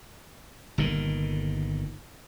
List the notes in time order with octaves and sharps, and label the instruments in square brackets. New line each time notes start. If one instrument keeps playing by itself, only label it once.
[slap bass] G1 A#2 D#3